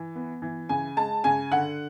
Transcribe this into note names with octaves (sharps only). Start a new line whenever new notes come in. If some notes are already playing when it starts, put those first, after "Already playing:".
Already playing: E3
B3
E3
C#3 G#5
G#3 A5
C#3 G#5
D3 F#5